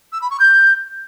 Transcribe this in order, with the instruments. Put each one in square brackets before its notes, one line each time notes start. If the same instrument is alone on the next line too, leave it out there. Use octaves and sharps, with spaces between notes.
[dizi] E6
B5
C#6
G6